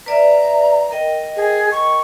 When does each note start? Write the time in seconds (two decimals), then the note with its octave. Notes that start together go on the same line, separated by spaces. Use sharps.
0.06 B4 D5 E5 A#5
0.91 A#4 D#5 G5
1.36 G#4
1.72 C#6